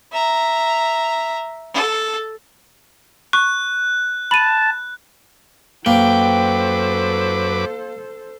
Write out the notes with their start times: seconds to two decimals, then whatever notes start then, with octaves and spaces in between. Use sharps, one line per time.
0.12 E5 A#5
1.74 A4
3.33 C#6 F#6
4.31 A5 B5 D#7
5.86 F#2 A#3 A4 B4 C5 G5 D6